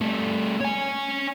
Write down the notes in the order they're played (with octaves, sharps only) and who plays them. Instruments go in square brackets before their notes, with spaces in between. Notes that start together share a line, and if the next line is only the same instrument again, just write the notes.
[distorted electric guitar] G3 A3
C#5 G#5